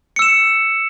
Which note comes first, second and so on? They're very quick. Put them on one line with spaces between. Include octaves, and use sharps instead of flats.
C#7 E6 E7